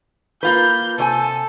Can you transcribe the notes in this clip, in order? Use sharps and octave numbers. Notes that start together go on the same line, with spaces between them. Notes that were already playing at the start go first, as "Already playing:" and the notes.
A#3 F4 B4 G6
C3 A4 C#5 G#5